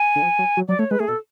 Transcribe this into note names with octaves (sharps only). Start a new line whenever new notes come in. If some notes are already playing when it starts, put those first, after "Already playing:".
Already playing: G#5
D3
F3
F#3
F#3
F#3 D5
A3 C#5
G#3 B4
A3 G#4
B2 A4